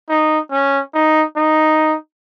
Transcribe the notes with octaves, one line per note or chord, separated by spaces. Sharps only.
D#4
C#4
D#4
D#4